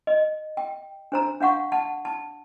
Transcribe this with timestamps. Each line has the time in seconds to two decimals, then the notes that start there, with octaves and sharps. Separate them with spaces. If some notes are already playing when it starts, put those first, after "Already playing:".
0.07 D#5
0.57 G5
1.12 D4 C5 A#5
1.40 D4 F5 F#5 C#6
1.72 F#5 A5
2.05 A5